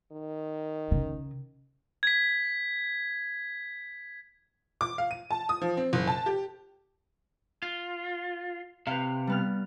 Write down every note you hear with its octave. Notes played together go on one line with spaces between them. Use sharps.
D#3
C#3
G#6 B6
D6
F5
D#7
A5
D#6
F3
C4
F#1
A5
G4
F4
C3 B4 F5
G3 B3 F6